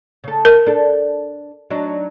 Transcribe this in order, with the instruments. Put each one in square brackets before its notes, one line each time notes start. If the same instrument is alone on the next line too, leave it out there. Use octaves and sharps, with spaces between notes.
[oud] C#3 A4
[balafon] A#4
[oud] D4 A4
F#3 D4 D#4